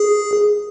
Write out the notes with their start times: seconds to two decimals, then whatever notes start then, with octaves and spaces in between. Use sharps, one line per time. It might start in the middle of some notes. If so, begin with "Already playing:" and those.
Already playing: G#4